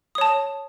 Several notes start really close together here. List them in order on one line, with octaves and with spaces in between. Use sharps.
D#6 C#5 A5